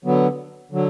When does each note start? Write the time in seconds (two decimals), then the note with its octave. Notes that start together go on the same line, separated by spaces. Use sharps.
0.04 D3 F#3 B3
0.71 D3 F#3